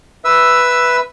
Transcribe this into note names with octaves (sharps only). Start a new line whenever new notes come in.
B4 E5 E6